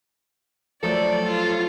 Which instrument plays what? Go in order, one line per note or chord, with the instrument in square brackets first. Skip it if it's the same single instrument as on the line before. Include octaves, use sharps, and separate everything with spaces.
[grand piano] F3 F#3 A3 [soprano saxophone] A4 [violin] D5
[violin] F4